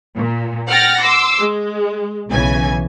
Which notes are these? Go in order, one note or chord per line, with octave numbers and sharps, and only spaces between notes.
A#2
F#5 G5 F6 A6 A#6
C6 D6 E6
G#3
B1 C#3 E3 G#5